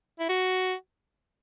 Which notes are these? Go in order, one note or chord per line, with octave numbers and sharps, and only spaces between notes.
E4
F#4